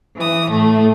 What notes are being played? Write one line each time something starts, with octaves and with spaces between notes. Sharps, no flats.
E3 D#6
A2 A3